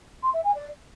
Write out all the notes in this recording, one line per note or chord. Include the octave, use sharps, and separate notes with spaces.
C6
E5
G#5
D5